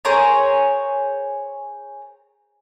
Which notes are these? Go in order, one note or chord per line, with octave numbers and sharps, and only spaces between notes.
G#4 A#4 C5 C#5